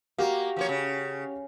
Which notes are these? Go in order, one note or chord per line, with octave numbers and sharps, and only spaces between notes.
A#3 F#4 G4 F5
F3 A#3 C#5
C#3